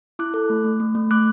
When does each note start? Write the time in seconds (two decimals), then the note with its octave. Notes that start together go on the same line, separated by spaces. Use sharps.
0.19 E4 D6 F#6
0.34 A4
0.50 A3
0.64 A3
0.80 A3
0.95 A3
1.11 A3 D6 F#6